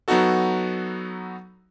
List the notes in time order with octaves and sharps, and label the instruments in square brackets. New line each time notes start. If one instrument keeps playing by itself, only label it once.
[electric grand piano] F#3 B3 D#4 F#4 A4